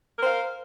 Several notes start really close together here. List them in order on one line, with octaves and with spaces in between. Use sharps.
A#4 C5 F5